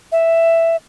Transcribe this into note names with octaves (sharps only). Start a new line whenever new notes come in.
E5